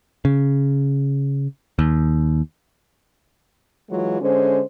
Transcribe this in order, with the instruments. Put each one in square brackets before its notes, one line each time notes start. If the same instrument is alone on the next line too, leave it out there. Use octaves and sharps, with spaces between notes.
[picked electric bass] C#3
D#2
[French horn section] E3 F#3 G#3 F4 F#4
D3 G#3 C#4 C5